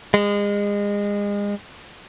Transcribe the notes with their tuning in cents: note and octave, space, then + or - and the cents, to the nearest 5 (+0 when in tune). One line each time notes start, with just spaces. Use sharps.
G#3 -30